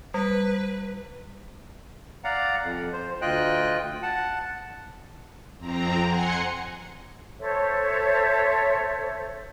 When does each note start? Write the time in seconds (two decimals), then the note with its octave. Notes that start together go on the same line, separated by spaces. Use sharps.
0.14 G3 B4
2.24 D5 F5 F#5 A#5
2.63 F2
2.93 C5
3.21 D2 F4 D#5 G5 F#6
4.03 F#5 A5
5.58 F2 C4 A#5
6.06 F#5 G#5 C6 C#7
7.39 A4 C5 C#5 E5